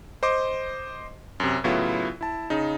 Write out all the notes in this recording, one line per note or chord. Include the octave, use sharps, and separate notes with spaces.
C5 D#5 C6 D6
F#2 C3
A2 C#3 F#3 B3 E4 F4
E4 A5
C#3 D#4